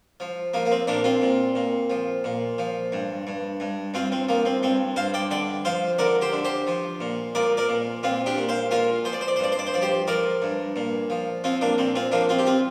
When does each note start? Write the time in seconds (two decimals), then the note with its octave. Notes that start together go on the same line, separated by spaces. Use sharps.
0.20 F3
0.54 F3 A#3
0.66 A#3
0.71 C4
0.87 A#2 A#3 D4
1.04 C4 F4
1.22 A#2
1.55 A#2
1.90 F3
2.24 A#2
2.58 F3
2.92 G2
3.27 G2
3.60 G2
3.94 G2 C4 F4
4.12 C4
4.29 F3 A#3
4.45 C4
4.63 G2 C4
4.96 G2 C5 F5
5.14 D5 G5
5.31 D3 D5 G5
5.65 F3 C5 F5
5.98 D3 A#4 D5
6.21 G4 C5
6.33 D3
6.44 G4 C5
6.67 F3
7.01 A#2
7.35 F3 A#4 D5
7.57 A#4 D5
7.69 A#2
8.03 A#2 C4 F4
8.26 D4 G4
8.37 A#2
8.49 C5 F5
8.71 A#2 F4 A#4
9.05 F3 C5
9.13 D5
9.21 C5
9.28 D5
9.36 C5
9.39 G2 D5
9.52 C5
9.59 D5
9.67 C5
9.74 F3 D5
9.82 G4 C5
10.07 F3 A#4 D5
10.42 G2
10.76 A#2
11.10 F3
11.44 F3 C4 F4
11.61 A#3 D4
11.78 A#2 C4
11.95 C4 F4
12.12 F3 A#3 D4
12.29 C4 F4
12.39 G4
12.46 C4 F4